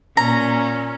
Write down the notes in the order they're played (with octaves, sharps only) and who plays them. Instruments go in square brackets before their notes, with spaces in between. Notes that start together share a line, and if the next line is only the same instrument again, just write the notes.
[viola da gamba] A#2 [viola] C#4 [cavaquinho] A#5